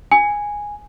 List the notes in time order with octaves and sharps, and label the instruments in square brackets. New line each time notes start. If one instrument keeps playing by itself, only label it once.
[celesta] G#5